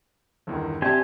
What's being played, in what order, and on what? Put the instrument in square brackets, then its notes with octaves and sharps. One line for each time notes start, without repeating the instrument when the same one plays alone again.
[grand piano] G1 E2 D#3
[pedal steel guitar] C4 G4 G#5 [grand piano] D5 E5 A5